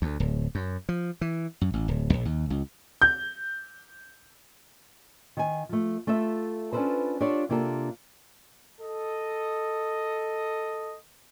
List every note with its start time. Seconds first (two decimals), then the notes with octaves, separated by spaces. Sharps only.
0.02 D2
0.20 D1
0.55 F#2
0.89 F3
1.21 E3
1.61 F#2
1.74 A1
1.88 D1
2.13 A#1
2.25 D#2
2.50 C#2
3.02 G6
5.37 D#3 G#5
5.69 F3 A3
6.07 A3 F4 A4 E5
6.73 C#4 D4 F4 A4 B4 C5
7.21 D4 F4 G4 A4 C#5 D5
7.49 C3 A#3 D4 F4 G4 A4
8.81 A4 D#5